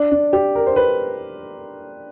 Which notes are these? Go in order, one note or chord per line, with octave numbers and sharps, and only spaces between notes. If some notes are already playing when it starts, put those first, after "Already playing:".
Already playing: D4
D4
G4
A#4
C5
B4